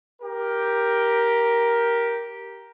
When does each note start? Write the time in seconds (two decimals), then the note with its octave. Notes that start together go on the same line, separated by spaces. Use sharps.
0.22 G4 A#4